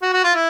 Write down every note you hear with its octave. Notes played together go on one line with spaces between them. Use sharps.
F#4
F#4
F4
E4